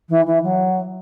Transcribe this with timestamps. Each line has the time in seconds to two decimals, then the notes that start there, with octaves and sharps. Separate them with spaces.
0.09 E3
0.26 E3
0.43 F#3